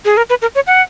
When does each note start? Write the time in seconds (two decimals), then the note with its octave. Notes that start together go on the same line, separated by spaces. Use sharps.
0.05 G#4
0.17 A#4
0.30 B4
0.42 A#4
0.55 C#5
0.67 F#5